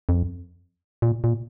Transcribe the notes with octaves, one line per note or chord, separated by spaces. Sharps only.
F2
A#2
A#2